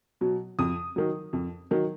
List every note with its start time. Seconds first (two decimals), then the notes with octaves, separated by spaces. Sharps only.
0.21 B2 F#3
0.59 F2 D#6
0.96 D#3 F#3
1.33 F2
1.71 D#3 F#3